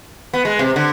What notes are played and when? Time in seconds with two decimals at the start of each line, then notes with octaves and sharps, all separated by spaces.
0.33 B3
0.45 G#3
0.59 C3
0.76 D3